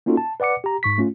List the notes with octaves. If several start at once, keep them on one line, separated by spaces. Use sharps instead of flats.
A#3 C#4 D#4 F4 F#4 A4
A5
B4 D5 F#5 D6 C#7
G4 A#5
G#2 C#6 B6
A3 C#4 F4